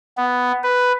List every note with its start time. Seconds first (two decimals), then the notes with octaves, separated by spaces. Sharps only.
0.17 B3
0.63 B4